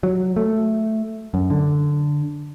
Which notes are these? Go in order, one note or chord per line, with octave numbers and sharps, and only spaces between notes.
F#3
A3
F#2
D3